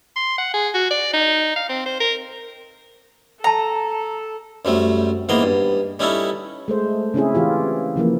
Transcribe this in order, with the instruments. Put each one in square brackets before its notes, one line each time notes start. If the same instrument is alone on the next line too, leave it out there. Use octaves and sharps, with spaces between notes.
[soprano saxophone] C6
F#5
G#4
F#4
D5
D#4
F5
C4
C5
A#4
[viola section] A4 [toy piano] G5 A5 [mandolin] A#5
[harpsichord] F#2 G3 A3 C4
G#2 E3 A#3 B3 A#5 C6
G2
G3 C#4 D#4 E4 A4
[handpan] G#3 A3 C5
C#3 C4 C#4 E4 G#4
E3 F4 G4
C#3 E3 F3 A#3